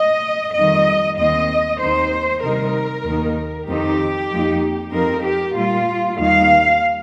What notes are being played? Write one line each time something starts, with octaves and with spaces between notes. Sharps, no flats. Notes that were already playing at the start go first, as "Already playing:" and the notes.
Already playing: D#5
F2 D#3 G3 D#5
D#2 D#3 C4 D#5
D#2 D#3 C4 D#4 C5
C3 D#3 G3 D#4 A#4
D#2 D#3 A#3 D#4
F2 D#3 C4 D#4 G4
F2 F3 A#3 D#4
F2 F3 C4 D#4 A#4
G4
A#2 G3 A#3 F4
D#2 D#3 G3 A#3 D#4 F5